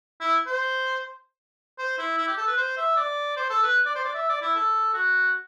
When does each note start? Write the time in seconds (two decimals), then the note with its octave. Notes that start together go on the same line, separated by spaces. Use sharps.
0.20 E4
0.46 C5
1.79 C5
1.99 E4
2.18 E4
2.27 G4
2.38 A4
2.47 B4
2.57 C5
2.77 E5
2.96 D5
3.37 C5
3.50 A4
3.63 B4
3.86 D5
3.96 C5
4.05 D5
4.15 E5
4.29 D5
4.42 E4
4.55 A4
4.94 F#4